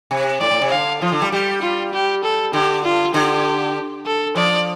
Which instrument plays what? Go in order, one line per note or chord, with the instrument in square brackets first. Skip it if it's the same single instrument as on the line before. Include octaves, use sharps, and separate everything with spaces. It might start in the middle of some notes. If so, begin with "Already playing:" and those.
[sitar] C3
[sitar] A2 [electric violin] D5
[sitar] A2
C3
[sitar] D3 [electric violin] F5
[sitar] F3 [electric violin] F4
[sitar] D3
G3
[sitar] G3 [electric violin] G4
[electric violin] F4
G4
A4
[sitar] D3 [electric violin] G4
[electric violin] F4
[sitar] D3 [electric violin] G4
[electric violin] A4
[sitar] F3 [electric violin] D5